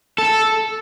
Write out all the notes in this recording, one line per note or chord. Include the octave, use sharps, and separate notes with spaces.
A4